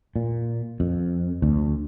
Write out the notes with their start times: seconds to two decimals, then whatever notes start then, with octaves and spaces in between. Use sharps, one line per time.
0.16 A#2
0.80 F2
1.42 D2